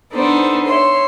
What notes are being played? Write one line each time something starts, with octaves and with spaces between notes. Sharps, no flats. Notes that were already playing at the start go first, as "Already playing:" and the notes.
B3 D4 D#4 A4 C5
C#5 E5 C6